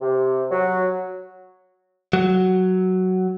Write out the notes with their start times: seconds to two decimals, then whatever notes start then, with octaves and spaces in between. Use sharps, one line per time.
0.01 C3
0.51 F#3
2.13 F#3